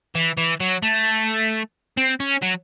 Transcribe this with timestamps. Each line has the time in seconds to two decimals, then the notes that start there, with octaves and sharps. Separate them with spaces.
0.15 E3
0.38 E3
0.60 F#3
0.83 A3
1.97 C4
2.20 C#4
2.43 F#3